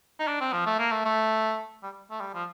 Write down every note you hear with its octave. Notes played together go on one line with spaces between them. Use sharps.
D#4
D4
C4
F3
A3
A#3
A3
A3
G3
A3
G3
F3